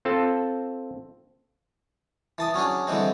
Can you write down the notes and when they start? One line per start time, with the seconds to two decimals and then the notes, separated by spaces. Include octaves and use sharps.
0.05 C4 F4 A4 A5
2.38 E3 A5 D#6
2.54 F#3 C#4 D4 G#4
2.87 D3 E3 G3 G#3 C4